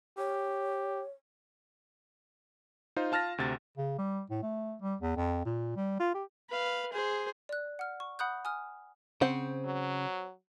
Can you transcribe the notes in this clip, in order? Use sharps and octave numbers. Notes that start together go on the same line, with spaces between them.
G4 C#5
D#4 F4 C5
F4 A5 F6 A6 A#6
D2 C3 A6
C#3
G3
A2
A3
G3
E2
F2
A#2
G3
F4
G4
B4 F5
G#4 C5
D5 F#6
F#5 F6
C#6
F#5 B5 D#6 F#6 G6
G#5 D#6 F6
C#3 C4 C5 F#5
F#3